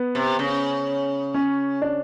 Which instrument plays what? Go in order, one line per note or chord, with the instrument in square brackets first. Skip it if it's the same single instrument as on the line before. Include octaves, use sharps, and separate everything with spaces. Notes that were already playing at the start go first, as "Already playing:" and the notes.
Already playing: [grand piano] B3
[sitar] C3
C#3
[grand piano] C#4
D4